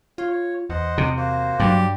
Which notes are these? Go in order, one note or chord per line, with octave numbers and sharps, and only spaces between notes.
F4 C#5
C#5
E2 C5 D#5 F#5
C3
A#3 F#4 C5
G2 F#3 G4